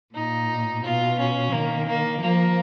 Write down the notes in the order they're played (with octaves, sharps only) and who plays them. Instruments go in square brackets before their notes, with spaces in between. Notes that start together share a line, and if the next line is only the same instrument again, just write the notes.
[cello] A#2 [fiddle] D#4
[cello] B2 [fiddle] F4
[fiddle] C#4
[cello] D#3 [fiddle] A#3
[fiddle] A#3
[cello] F3 [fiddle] A#3